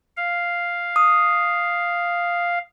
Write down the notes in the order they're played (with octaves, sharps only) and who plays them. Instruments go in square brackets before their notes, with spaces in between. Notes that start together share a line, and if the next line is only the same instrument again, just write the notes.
[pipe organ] F5
[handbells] D#6